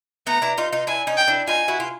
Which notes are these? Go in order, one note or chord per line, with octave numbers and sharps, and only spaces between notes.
A3 B3 A#5
D4 E4
D#4 F4
D#4 F4
D4 E4 G#5
C#4 D#4
G5
D4 E4
D#4 F4 G#5
E4 F#4
F4